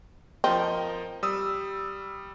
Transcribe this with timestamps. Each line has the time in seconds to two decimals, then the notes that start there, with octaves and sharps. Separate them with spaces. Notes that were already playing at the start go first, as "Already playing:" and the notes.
0.44 F3 C4 A#4 D#5
1.23 G3 D#6 E6